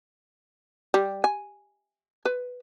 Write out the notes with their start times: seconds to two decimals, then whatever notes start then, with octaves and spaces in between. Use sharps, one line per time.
0.94 G3
1.24 G#5
2.25 B4